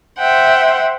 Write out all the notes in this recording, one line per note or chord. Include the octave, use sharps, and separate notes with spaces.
C5 E5 F#5 G5